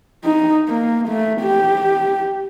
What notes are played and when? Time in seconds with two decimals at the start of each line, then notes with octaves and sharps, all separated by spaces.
0.25 D#4
0.69 A#3
1.08 A3
1.42 G4